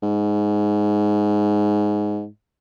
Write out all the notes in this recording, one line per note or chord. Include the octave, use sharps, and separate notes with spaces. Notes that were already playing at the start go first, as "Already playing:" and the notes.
G#2